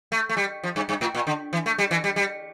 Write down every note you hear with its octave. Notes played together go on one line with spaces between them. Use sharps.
A3
A3
G3
F3
G2
G2
A2
A#2
D3
E3
A3
G3
E3
G3
G3